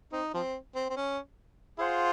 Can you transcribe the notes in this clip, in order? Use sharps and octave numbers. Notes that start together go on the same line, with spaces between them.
C4 D#4
F3 C4
C4
C4
C#4
F4 G#4 C5 F#5